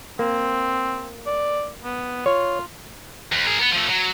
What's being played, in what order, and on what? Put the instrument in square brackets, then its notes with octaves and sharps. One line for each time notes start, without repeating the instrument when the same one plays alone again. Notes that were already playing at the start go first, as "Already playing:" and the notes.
[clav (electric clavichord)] A#3 [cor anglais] C4
[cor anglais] D5
B3
[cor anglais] F4 [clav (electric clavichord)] C#5
[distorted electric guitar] D#2
G#4 A#4
B3
F3 A3
F#3